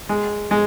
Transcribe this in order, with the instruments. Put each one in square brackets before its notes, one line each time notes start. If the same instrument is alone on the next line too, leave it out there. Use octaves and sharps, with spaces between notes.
[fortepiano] G#3
G#3